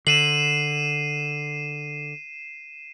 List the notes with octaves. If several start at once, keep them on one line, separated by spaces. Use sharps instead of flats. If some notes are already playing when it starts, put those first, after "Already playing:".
D3 C7 D#7 E7 F#7